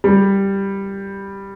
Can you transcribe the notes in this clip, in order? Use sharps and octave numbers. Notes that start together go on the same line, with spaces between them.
G3